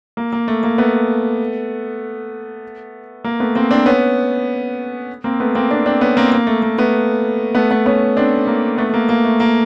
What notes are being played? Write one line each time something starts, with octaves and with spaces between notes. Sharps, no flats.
A#3
A#3
A3
A#3
A3 B3
A#3
A3 B3
A#3 C4
C4 D4
B3 C#4
A#3 C4
A3 B3
A#3 C4
C4 D4
C4 D4
B3 C#4
A#3 C4
A#3
A3
A#3
A3 B3
A3 B3
A3 B3
B3 C#4
C4 D4
A#3
A3 B3
A3
A#3
A#3
A3
A#3